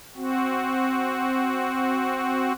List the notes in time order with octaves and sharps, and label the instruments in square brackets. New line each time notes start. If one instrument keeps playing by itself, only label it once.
[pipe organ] C4 F#4